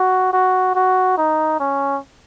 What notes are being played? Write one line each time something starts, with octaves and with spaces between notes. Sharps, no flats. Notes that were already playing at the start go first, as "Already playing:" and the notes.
Already playing: F#4
F#4
F#4
D#4
C#4